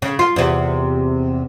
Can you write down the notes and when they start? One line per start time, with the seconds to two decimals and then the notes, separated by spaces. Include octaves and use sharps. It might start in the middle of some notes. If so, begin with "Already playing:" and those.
0.02 C#3
0.19 F4
0.36 E2 C3